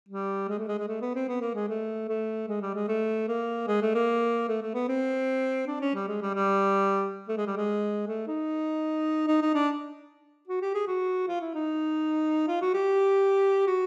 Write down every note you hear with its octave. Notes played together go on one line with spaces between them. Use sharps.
G3
G#3
A3
G#3
G#3
A3
B3
C4
B3
A#3
G#3
A3
A3
G#3
G3
G#3
A3
A#3
G#3
A3
A#3
A3
A3
B3
C4
D4
C#4
G3
G#3
G3
G3
A3
G#3
G3
G#3
A3
D#4
D#4
D#4
D4
F#4
G4
G#4
F#4
F4
E4
D#4
F4
F#4
G4
F#4